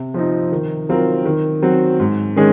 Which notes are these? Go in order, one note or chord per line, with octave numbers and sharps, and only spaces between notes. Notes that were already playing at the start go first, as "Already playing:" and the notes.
Already playing: C3
F3 C4 D#4
D#3
F#3 C4 F4 A#4
D#3
F#3 C4 F#4
G#2
D#3 G#3 C#4 G#4